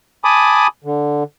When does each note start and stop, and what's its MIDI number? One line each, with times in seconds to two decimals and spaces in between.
0.24 0.67 80
0.24 0.67 81
0.24 0.67 83
0.24 0.67 86
0.24 0.67 87
0.84 1.23 50